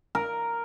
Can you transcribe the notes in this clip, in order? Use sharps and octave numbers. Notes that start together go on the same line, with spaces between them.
A#4